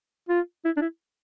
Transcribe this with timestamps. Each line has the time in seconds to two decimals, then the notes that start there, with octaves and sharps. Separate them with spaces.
0.29 F4
0.65 E4
0.77 D4
0.82 E4